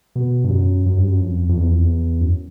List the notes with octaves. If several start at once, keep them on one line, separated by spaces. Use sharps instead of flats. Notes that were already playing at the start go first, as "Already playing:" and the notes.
B2
G2
F#2
F#2
G2
F#2
F2
F2
E2
F2
E2
F#2